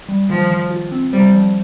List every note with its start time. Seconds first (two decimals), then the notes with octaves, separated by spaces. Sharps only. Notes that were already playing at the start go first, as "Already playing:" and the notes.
0.09 G3
0.29 D#3 F3
0.50 D#3
0.70 F4
0.92 C4
1.13 G3 C5
1.34 F3